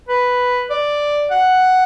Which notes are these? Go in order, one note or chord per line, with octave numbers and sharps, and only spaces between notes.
B4
D5
F#5